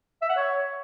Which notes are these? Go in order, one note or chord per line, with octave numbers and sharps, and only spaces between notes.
E5
F#5
C#5